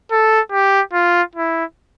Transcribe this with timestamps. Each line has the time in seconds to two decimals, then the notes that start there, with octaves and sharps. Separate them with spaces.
0.11 A4
0.52 G4
0.93 F4
1.35 E4